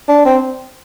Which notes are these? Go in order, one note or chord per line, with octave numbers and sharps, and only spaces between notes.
D4
C4